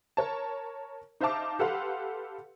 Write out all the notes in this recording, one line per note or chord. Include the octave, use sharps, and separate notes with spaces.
A#4 C#5 A5
D#4 C5 E5 F5 A5 D6
G4 A4 B4 F5 F#5 C6